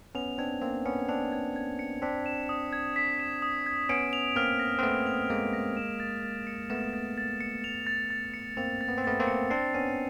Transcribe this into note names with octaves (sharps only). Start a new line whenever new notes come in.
B3 C#4 F7
C4 D4 G#6
A#3 C4 G#6
B3 C#4 C#7
C4 D4 F7
G#6
G#6
C#7
C4 D4 B6
E7
D#6
G#6
B6
E7
D#6
G#6
B3 C#4 D7
F7
A#3 C4 F6
A#6
C4
A3 B3 D7
F7
G#3 A#3 F6
A#6
E7
A6
A6
C#7
A3 B3 E7
A6
A6
C#7
F7
A6
A6
C#7
A#3 C4 F7
A6
B3
C4
A3 B3 A6
A#3 C4
C#7
C4 D4 C7
B3 C#4 D#7